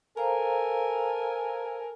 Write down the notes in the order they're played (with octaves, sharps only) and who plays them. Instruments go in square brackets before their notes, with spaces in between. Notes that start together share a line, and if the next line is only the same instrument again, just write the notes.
[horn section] A4 A#4 G#5 [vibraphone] C5 F5 A#5